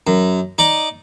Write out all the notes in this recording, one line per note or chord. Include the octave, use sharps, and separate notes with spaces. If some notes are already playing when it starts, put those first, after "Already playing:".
F#2
D#4 D5